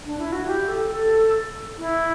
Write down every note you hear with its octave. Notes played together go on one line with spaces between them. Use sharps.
D4
E4
F#4
G4
A4
A4
E4